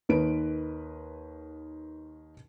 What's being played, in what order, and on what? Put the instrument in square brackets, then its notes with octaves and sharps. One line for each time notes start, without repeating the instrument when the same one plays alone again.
[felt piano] D#2 D#3 B4 D7